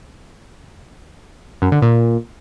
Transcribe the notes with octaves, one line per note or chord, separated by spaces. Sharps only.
F#2
D3
A#2